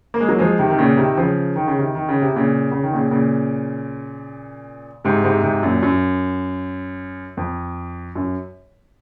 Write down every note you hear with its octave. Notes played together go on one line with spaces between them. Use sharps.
A#3
G#3
F#3 A#3
F3 G#3
C3 D#3
D#3
A#2 C#3
C3 D#3
C#3 F3
D#3
C#3
C3 D#3
D#3
C#3
C3
A#2 C#3
C#3
D#3
A#2 C#3
A#2 C#3
G#2 C3
G#2 C3
G#2 C3
F#2 A#2
F#2
F2
F#2